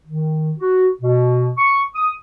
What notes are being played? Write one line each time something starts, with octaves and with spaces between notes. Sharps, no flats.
D#3
F#4
B2
C#6
D#6